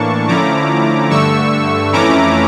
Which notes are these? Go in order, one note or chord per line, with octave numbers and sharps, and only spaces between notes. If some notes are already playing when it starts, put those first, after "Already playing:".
Already playing: A2 E3 A#3 D4 A5 C#6
D3 F3 A3 C#4 E4 A#5 D6
G2 D3 A3 C#6 E6
F2 E3 A3 C#4 E4 A#5 D6